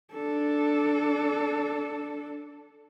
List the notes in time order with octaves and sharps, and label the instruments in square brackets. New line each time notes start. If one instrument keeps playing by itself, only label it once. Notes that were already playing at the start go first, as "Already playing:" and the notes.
[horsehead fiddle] D4 A4